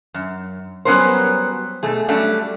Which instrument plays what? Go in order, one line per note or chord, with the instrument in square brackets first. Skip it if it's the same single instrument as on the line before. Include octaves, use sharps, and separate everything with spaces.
[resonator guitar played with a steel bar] F#2
F#3 G3 B3 C#4 A#4 C5
B2 A3 G#4
F#3 G3 A3 C#4 D4